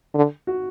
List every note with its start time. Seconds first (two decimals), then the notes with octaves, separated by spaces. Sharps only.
0.14 D3
0.47 F#4